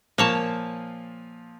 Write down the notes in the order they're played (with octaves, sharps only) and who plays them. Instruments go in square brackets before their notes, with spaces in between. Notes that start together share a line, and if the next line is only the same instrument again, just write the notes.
[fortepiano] A#2 F3 [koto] A#3 C#5 A5